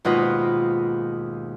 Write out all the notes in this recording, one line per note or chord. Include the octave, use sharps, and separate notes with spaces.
D#2 G#2 B2 F4 B4 D#5